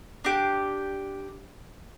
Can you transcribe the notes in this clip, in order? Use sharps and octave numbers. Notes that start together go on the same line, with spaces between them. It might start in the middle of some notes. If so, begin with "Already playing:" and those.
D4 G4